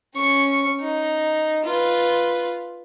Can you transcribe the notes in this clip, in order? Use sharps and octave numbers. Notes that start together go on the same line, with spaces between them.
C#4 C#6
D#4
F4 B4